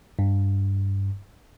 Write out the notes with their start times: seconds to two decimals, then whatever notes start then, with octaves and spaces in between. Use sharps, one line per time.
0.19 G2